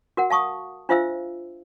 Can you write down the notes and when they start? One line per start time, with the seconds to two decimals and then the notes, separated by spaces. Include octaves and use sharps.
0.17 F#4 A#4 F#5
0.30 F5 A5 C#6 D#6
0.89 D4 F4 C5 E5 F5 E6